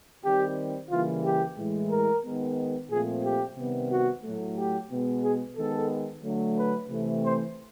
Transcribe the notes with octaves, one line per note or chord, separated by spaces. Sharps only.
D#3 G3 C4 G4
C#3 E3 G3 A#3 F4
G4
A2 E3 G#3
A#4
D#3 G#3 B3
A#2 F3 A3 C4 G#4
G4
C3 D#3 G3 B3
F#4
A2 F#3 A3
G4
B2 G#3 B3
G#4
D#3 G#3 B3 A4
D3 F#3 A3
B4
C3 E3 A3 C4
C5